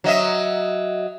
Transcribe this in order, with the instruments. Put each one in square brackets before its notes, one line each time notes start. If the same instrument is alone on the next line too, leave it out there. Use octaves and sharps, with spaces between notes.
[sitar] F#3 D#5 E5